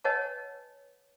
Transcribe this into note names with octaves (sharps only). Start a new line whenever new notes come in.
B4 C#5 D#5 F#5 G#5 A5